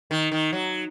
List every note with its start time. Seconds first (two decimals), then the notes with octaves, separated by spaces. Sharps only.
0.11 D#3
0.32 D#3
0.53 F#3